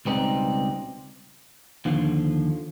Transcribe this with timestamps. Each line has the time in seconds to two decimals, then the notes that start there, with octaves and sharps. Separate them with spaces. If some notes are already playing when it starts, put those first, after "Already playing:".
0.05 C#2 B2 G3 C4 D#4
1.85 D#2 D3 F3